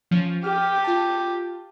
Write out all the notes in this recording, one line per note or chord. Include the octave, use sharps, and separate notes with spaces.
F3 C#4
G4 F6
F4 A5